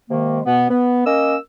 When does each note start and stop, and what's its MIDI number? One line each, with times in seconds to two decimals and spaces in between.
0.09 0.40 48
0.09 0.40 51
0.09 0.40 56
0.09 0.40 58
0.45 0.66 47
0.45 0.66 59
0.69 1.02 59
1.06 1.36 58
1.06 1.36 61
1.06 1.36 70
1.06 1.36 75
1.06 1.36 88